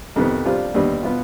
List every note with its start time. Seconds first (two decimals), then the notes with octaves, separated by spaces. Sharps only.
0.16 F2 C3 D#3 B3
0.45 C3 G3 D4 F4
0.75 D#2 D3 G3 B3
1.03 B2 B3 F4